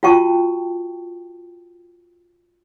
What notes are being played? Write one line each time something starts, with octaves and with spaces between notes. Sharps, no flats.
F4 F#4 G5 A5 C#6